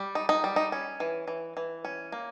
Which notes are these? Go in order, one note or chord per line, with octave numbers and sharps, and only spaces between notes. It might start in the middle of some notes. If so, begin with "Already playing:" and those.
Already playing: G3
D#4
D#4
G3
D#4
C#4
E3
E3
E3
C#4
A#3